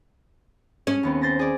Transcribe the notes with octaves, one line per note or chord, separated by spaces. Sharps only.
C#4 G#4
D#2 B3 C4
C5 A6 A#6
G#4 D5